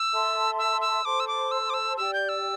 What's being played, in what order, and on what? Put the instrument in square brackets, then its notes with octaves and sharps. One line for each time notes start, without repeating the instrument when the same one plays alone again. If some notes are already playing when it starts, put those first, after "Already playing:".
Already playing: [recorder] E6
[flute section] A4 E5 A5 C6
[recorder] E6
E6
[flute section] A4 C5 A5 C6 [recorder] D6
[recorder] E6
D6
E6
D6
E6
[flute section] G4 D5 G5 [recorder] E6
[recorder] G6
E6